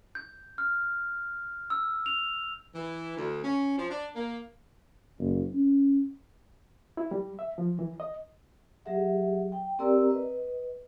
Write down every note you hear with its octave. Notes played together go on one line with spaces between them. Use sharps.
G6
F6
E6
F7
E3
D2
C#4
F3
D4
A#3
F#1
C#4
E4
G3
E5
F3
E3
D#5
F#3 G4 G#4 E5 F#5
G5
C4 G4 A#4 D5 A#5 E6
B4 D#5